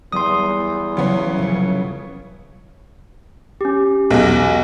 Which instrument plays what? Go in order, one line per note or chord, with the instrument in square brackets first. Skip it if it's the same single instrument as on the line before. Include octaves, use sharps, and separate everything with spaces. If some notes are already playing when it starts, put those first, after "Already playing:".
[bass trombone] E2 [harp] G3 [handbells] C6 D#6
[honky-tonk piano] C#3 B3 [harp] E3 F#3
[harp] F1 C#4 C#5
[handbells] C#4 G4
[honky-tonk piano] B1 E2